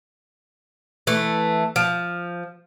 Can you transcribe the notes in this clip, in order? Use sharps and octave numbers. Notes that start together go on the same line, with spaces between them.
E3 A3
F3